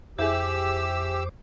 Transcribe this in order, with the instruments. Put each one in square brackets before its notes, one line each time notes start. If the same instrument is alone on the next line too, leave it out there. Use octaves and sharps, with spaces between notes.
[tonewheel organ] F2 C5 D6 [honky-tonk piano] E4 G#4 [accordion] G4 E6